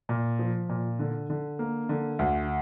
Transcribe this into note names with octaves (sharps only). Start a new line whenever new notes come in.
A#2
F3
A#2
D3
D3
A#3
D3
D2